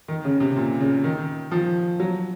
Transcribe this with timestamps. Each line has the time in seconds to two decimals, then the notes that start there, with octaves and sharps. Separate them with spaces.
0.08 D#3
0.25 C#3
0.40 C3
0.56 A#2
0.80 C#3
1.04 D#3
1.52 F3
2.00 F#3